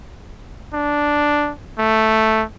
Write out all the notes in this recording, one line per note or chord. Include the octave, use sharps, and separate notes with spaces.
D4
A3